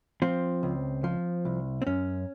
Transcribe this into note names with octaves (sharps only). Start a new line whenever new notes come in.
F3 C4
C#2
F3
C2
C4
F#2 C#4